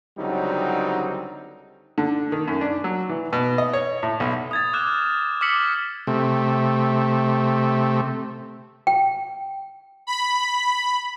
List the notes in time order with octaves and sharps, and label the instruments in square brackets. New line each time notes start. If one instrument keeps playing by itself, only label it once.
[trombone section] C#2 D3 F#3 G3 C4 D#4
[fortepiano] D3
D#3
F#2
D4
F#3
E3
B2
D#5
C#5
A2
B1
[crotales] D#6 G#6 A6
D6 F6 F#6 E7
D6 E6 F6 B6 C#7 F#7
[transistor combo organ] C3 A3
[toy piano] G5
[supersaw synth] B5